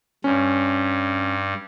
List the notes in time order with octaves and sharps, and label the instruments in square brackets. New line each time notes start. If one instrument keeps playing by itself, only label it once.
[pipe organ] G2 [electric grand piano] C#4